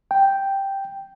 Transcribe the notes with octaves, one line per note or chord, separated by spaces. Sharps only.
G5